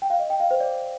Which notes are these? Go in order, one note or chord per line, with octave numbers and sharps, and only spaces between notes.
G5
F5
D#5
G5
F5
C5
D5